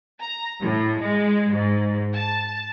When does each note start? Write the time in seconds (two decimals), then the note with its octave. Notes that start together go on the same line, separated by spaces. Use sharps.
0.20 A#5
0.60 A2
1.00 G#3
1.53 G#2
2.16 A5